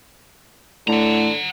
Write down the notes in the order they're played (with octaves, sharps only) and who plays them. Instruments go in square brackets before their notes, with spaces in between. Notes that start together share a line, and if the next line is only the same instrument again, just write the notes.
[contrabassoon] A2 [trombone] D3 [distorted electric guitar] F#5 A#5